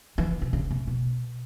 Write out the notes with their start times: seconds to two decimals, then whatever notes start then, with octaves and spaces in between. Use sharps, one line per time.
0.18 E3
0.42 C3
0.53 C#3
0.71 C3
0.87 B2